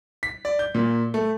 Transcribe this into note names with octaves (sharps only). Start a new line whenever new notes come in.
B6
D5
G6
A#2
A3